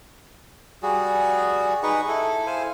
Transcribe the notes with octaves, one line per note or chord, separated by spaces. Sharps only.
G3 F#4 G#4
D#4 G#4 B4 C#6
E4 A4
E4 C5 F5 G#5